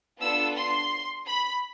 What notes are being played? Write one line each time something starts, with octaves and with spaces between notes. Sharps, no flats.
B3 D4 F4 A4 E6
C6
B5